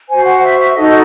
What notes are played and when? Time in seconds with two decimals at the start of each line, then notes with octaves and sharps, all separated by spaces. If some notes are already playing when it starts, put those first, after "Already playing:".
0.09 F#4 C5 G#5
0.25 F#5
0.41 E5
0.58 E5
0.74 D#4 F#4 A4 D#5